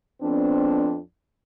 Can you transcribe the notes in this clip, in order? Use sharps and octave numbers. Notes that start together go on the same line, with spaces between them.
F2 B3 C4 D4